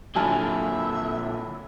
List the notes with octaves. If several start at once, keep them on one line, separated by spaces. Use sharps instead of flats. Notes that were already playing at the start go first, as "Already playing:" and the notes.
A#2 D3 F#3 E4 E5 G#5 A5 F6